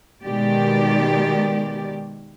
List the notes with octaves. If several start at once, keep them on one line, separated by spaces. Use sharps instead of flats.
B2 D#3 G#3 G4 D5